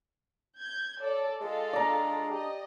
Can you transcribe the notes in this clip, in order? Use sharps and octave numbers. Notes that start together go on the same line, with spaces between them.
G6 G#6
A4 C#5 D5
G#3 F4 A4 D#5
D4 D5 A#5
G4 D#5